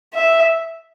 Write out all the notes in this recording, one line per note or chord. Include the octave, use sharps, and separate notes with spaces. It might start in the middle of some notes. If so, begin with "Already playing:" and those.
E5